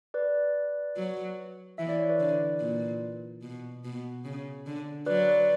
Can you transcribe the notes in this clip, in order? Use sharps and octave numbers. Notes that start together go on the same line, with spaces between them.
B4 D5
F#3
E3 E5
D5
C#5
B4 D5
D3
A#2
B2
B2
C#3
D3
F#3 B4 D5
B4 D5